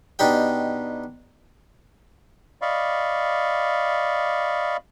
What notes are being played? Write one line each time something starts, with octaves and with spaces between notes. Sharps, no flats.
B2 D4 D#4 G4 G5
D5 D#5 F5 B5 C#6